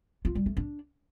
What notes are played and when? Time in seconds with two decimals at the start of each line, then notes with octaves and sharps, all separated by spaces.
0.25 F4
0.35 G3
0.46 A3
0.57 D4